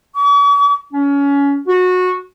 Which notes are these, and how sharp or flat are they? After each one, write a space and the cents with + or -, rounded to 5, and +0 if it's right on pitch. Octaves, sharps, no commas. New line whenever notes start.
C#6 +45
C#4 +25
F#4 -20